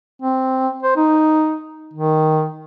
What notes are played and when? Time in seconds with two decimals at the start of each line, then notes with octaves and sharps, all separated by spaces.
0.22 C4
0.82 C5
0.96 D#4
1.94 D#3